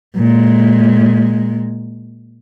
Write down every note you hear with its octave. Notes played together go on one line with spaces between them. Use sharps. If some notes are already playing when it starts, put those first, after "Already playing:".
A#2 G#3